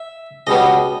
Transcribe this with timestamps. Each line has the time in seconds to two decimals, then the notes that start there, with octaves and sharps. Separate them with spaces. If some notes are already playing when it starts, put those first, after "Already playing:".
Already playing: E5
0.47 C#2 B2 G3 B3 D#5